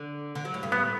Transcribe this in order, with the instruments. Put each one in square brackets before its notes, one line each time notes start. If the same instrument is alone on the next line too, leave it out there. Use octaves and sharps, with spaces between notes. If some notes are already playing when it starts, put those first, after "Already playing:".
Already playing: [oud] D3
D3
F#3
A2
G2
[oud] A2 [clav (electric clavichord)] B3